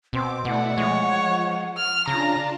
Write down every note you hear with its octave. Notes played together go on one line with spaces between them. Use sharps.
B2 C4 D6
B2 A3 E4 D5 F#5
F3 G#3 C#5
F6
C#3 D4 F4 A5 A#5